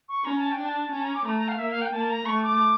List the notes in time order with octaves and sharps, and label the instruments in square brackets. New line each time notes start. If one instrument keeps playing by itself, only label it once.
[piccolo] C#6
[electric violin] C#4 [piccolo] A#5
[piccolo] A5
G5
[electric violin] D4
[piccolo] A5
[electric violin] C#4 [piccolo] A5
[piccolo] A#5
D6
[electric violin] A3 [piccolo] A#5
[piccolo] A#5
F5
[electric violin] A#3 [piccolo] E5
[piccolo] F5
G5
[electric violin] A#3 [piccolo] A5
[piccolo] A#5
[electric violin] A3 [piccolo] C#6
[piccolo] D6